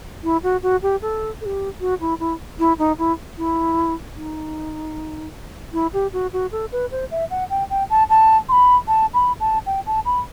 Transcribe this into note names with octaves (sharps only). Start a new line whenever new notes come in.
E4
F#4
F#4
G4
A4
A4
G4
F#4
E4
E4
E4
D#4
E4
E4
D#4
E4
G4
F#4
F#4
A4
B4
C5
E5
F#5
G5
G5
A5
A5
C6
B5
A5
B5
A5
G5
A5
B5